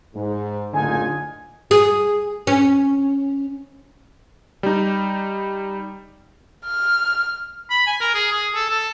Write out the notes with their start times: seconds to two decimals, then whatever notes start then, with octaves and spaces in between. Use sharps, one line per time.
0.14 G#2
0.73 F#1 A2 D3 D#4 F4 G#5
1.71 G#4
2.47 C#4
4.63 G3 D#4
6.66 F6
7.70 B5
7.87 G#5
8.01 A#4
8.15 G#4
8.32 G#4
8.55 A4
8.70 A4